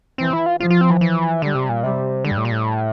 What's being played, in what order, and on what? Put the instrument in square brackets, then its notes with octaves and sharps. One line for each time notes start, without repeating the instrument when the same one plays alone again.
[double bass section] E3 [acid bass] C4
[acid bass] E4
F4
[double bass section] F3 [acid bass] F4
[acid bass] F4
C4
E3
E3
[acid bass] D3 [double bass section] G3
[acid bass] C3
A#2
[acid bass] C3 [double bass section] G3
[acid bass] D3 [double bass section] G3
[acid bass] G2
A2
A#2
A2